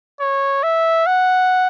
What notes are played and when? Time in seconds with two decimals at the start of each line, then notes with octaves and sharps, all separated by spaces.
0.20 C#5
0.63 E5
1.06 F#5